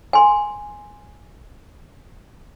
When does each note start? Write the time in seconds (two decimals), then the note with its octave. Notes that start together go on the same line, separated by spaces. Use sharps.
0.13 G#5 C6